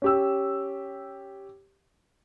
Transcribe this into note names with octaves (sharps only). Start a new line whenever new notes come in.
C#4 G4 E6